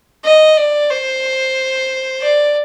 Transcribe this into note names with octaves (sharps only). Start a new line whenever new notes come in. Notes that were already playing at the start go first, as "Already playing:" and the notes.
D#5
D5
C5
D5